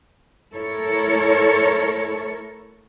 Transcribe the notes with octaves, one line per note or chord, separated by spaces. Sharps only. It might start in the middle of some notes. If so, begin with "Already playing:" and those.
A3 E4 A4 A#4 C#5